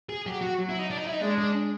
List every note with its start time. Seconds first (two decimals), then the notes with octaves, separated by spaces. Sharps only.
0.09 G#4
0.25 F#3 G4
0.41 F#4
0.58 F#3
0.69 E4
0.79 D#4
0.90 D4
0.98 D#4
1.06 E4
1.14 D#4
1.22 G#3 D4
1.38 D4